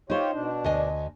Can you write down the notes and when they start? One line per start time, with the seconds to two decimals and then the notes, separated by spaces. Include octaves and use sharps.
0.10 D#4 F4 G4 C5 C#5
0.33 B2 D4
0.64 D2 D#5 G#5